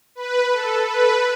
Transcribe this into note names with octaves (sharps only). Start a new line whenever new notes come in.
B4
A4
B4